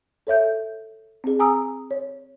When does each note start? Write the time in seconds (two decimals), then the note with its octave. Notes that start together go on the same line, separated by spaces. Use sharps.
0.27 A4 C#5 E5 G6
1.24 C4 G#4
1.39 G#5 A#5 D#6 E6
1.91 C#5